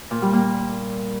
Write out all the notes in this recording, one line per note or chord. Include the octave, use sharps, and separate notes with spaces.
A#2
G3
A#3